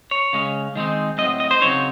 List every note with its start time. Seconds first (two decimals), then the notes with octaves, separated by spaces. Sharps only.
0.11 C#5
0.33 C#3 G#3 C#4
0.76 D#3 G#3 C4 D#4
1.18 A2 F#3 C4 D#5
1.40 D#5
1.51 C5
1.61 C#3 F#3 C4 D#4 C#5